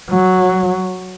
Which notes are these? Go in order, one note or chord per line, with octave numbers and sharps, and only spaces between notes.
F#3